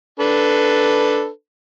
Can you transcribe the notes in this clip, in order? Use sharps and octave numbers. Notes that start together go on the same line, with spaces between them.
D4 A4 B4